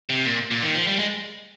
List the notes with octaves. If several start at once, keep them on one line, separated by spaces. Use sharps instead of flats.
C3
A#2
A#2
D#3
F3
G3
G#3